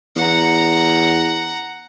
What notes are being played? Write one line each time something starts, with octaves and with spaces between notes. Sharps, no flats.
E2 F#5 A#5